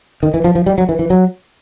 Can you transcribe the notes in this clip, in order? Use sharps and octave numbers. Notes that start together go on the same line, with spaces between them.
D#3
E3
F3
F3
G3
F#3
E3
E3
F#3